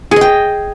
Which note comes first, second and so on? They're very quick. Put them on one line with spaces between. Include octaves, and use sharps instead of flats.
G#4 D#5 G5